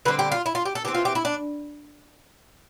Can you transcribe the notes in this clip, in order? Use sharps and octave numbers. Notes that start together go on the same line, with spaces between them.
D3 G3 C4 B4
G4
F4
E4
F4
G4
A4
E3 A3 C4 G4
F4
G4
E4
D4